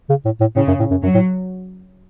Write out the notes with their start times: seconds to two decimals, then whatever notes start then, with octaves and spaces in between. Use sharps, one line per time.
0.09 C#3
0.25 A2
0.40 A2
0.56 A2 C#3
0.68 F#2
0.79 A2
0.91 F#2
1.02 F#2 F#3
1.14 A2